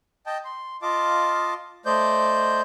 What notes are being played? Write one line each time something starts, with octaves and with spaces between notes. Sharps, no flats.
D#5 G5 A5
C6
F4 D#5 F5 A5 D6
A3 C5 D5 D#5 G6